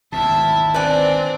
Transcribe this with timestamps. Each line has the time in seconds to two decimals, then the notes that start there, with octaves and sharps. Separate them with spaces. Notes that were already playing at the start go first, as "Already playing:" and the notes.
0.12 G#1 D2 B2 E4 E5 A5
0.74 C4 D4 B4 D5 G#5